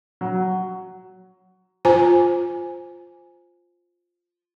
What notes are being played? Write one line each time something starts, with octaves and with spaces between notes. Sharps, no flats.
F#3
F4 C5 G#5 A#5